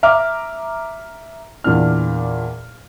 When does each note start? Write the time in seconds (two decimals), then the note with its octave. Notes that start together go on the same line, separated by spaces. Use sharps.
0.03 E5 A#5 D6 F6
1.64 E2 A#2 D4 F6